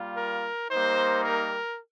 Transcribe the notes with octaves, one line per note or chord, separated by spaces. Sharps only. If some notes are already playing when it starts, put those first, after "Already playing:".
Already playing: G3 A#3 F4
A#4
G3 A#3 D#4 C5
A#4